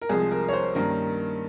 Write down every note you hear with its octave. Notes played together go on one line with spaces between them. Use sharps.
A#4
C2 C3 F3 G#3 G#4
A#4
C#5
C5
G2 D#3 A#3 C#4 A#4